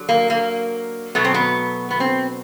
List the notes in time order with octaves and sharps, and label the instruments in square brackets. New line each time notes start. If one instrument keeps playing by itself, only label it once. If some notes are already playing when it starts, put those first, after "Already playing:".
Already playing: [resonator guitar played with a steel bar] D3 F#3
A#3
A#3
B2 F#3 A3 B3
C4
B3
B3
C4